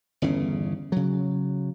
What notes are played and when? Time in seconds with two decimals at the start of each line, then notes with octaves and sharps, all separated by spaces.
0.22 G1 E2 C#3 C#4
0.92 C#3 F#3